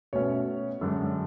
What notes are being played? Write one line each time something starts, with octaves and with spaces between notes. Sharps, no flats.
B2 A3 C#4 C#5
F#2 D3 G#3 D4